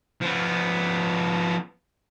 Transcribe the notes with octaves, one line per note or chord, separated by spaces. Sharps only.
F3 B3